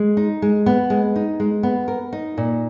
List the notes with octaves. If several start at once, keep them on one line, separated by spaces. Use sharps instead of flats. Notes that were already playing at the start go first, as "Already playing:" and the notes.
Already playing: G#3
D#4
G#3
B3
G#3
D#4
G#3
B3
A#4
D#4
A#2